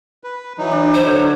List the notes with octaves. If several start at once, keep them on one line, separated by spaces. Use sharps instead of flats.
B4
E3 F#3 D#4
D4
C5
D3 C#5